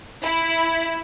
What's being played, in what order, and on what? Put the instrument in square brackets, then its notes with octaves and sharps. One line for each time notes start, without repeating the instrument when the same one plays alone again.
[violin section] E4